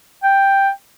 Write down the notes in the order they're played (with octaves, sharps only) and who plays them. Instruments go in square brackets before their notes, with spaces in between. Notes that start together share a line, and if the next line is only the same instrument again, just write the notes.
[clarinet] G5